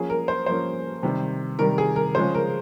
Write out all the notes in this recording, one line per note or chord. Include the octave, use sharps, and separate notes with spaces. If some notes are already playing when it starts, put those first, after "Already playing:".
Already playing: F3 A#3 C#4 G#4
A#4
C5
F3 A#3 C#4 C5
C3 D#3 G3
C3 D#3 G3 A#4
G#4
A#4
C#3 F3 G#3 C#4 C5
A#4